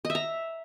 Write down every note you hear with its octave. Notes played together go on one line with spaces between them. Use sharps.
D#5
E5
A#5